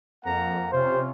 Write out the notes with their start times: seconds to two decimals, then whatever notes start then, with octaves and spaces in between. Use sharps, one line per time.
0.25 F2 A#3 F#5 A#5
0.73 C3 C#4 F4 C5